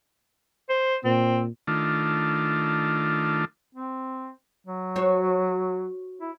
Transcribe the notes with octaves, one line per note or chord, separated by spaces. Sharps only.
C5
A#2 C4
D#3 A3 D4 F4
C4
F#3
F#4 C5 C#5
E4